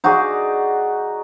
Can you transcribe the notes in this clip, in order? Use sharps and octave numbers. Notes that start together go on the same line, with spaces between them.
D#4 F#4 G#4 D5